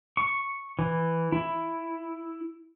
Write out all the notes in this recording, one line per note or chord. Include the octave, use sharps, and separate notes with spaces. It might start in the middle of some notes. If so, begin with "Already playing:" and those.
C#6
E3
E4